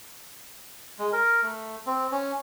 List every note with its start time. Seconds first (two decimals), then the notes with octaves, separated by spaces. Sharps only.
0.99 G#3
1.13 A#4
1.43 A3
1.86 C4
2.12 C#4